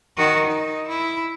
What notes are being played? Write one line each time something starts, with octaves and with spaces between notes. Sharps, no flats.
D#3 F#4
D#4
E4